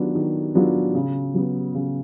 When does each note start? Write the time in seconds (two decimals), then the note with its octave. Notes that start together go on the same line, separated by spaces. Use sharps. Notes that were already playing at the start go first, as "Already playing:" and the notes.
Already playing: D#3 F#3 B3 D4 F4
0.15 D#3
0.55 F#3 B3 D4 F4
0.95 C#3
1.34 F#3 B3
1.74 C#3